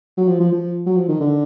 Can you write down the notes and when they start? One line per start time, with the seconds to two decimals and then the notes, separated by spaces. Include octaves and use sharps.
0.18 F#3
0.28 F3
0.40 F3
0.52 F3
0.86 F#3
0.97 F3
1.08 D#3
1.20 D3